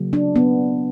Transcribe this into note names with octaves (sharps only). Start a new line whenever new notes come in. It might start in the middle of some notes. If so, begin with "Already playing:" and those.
Already playing: C#3 F#3 A#3
D4
B3